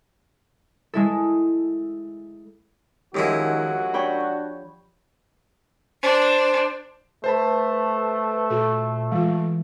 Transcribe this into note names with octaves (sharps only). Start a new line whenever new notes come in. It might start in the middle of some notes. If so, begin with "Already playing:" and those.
G#3 E4 A4
F#2 D#3 F3 G#3 E4 F#4 G4
D4 C#5 G5 B5
D4 C5
A3 B4 C5 A5 B5
A#2 F#4 A4
E3 G#3 F4